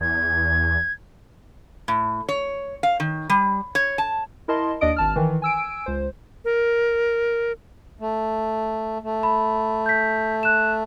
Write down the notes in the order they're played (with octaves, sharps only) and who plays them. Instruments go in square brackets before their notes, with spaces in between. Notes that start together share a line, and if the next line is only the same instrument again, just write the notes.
[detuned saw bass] E2 [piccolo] G#6
[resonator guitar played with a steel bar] A2
C#5
F5
D#3
G3
C#5
A5
[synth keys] E4 A#4 D#5 A5 C6
D#2 D4 D5 D#5 D#6 D7
G#1 A5 F6
D#3 E3
G#5 E6 D7
C#2 C5
[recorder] A#4
[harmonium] A3
A3
[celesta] B5
G6 B6
F#6 E7